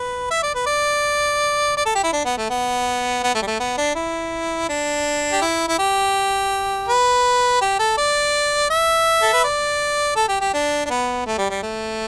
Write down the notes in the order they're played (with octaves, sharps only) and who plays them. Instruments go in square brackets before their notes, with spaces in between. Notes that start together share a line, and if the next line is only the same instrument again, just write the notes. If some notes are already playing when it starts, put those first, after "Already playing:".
Already playing: [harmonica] B4
E5
D5
B4
D5
D5
A4
G4
E4
D4
B3
A3
B3
B3
A3
G3
A3
B3
D4
E4
D4
G4
E4
E4
G4
B4
G4
A4
D5
E5
A4
B4
D5
A4
G4
G4
D4
D4
B3
A3
G3
G3
A3